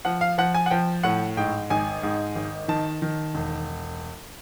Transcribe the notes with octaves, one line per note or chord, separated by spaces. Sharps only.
F3 F#5
F5
F3 F#5
G#5
F#5
F3 G5
A2 F#5
G#2 G5
G#1 G#5
G#2
G#1
D#3 A5
D#3
E1